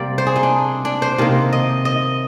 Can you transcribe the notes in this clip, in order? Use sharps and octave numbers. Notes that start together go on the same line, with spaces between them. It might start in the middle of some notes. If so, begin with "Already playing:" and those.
Already playing: C3 G3 A#3 D5
C5
G#4
D#4
D4
D4
C5
C3 D#3 A#3
D#5
D#5